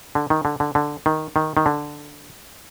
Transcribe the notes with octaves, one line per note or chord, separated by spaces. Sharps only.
D3
D#3
D3
D3
D3
D#3
D#3
D#3
D3